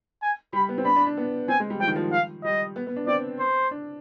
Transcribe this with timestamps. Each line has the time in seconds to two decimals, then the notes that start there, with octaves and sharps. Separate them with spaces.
0.22 G#5
0.53 G3 B5
0.69 B3
0.78 C4
0.85 D4 B5
0.96 D4
1.06 D4
1.17 B3
1.48 C4 G#5
1.60 G#3
1.70 G3
1.80 F3 G5
1.87 D#3
1.96 F3
2.12 F5
2.44 G3 D#5
2.76 B3
2.87 B3
2.96 D4
3.07 C4 D5
3.40 C5
3.71 D4